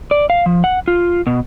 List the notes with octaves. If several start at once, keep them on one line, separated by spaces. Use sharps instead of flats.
D5
F5
F3
F#5
F4
B2